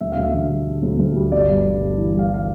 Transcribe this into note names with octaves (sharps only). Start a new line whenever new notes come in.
D2 E5
D2 F5
E5
D3
G3
D3
D2
D2
G3
G1 D5
G2
G1
G2
E3
G2
F5
E3 F5